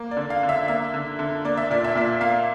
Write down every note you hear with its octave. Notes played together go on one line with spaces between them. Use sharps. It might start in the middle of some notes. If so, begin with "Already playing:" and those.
Already playing: A#3
D5
D3
F5
D3
E5
A#3 E5
D3
D3
A#3 D5
E5
A#2 D5
E5
A#2 D5
A#3 F5